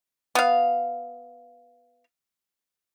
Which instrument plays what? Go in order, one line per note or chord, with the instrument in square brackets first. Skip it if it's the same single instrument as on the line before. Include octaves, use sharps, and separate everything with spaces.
[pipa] B3 F5